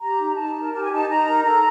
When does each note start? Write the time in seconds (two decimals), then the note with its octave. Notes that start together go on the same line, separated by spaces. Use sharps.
0.01 G4 A#5
0.19 D#4
0.37 D#4 A5
0.56 A#4
0.73 G4 A5
0.83 G#5
0.91 D#4 A5
1.09 D#4 A#5
1.26 A#4
1.45 A4 A#5